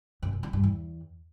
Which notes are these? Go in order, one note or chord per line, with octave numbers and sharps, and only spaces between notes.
F#2
A#2
D3
G2
E2